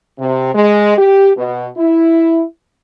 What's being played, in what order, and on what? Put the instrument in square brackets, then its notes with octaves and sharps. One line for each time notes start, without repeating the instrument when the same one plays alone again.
[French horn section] C3
G#3
G4
B2
E4